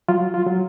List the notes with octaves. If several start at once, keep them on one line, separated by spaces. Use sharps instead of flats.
F#3 F4
F4
F#3